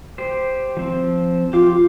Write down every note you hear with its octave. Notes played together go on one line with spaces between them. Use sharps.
G4 C5
F3 C4
F4 G4 F5 D6